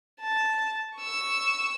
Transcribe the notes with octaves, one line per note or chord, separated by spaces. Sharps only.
A5
C#6 E6